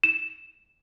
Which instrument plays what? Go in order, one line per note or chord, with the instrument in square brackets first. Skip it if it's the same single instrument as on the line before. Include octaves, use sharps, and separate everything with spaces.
[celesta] E7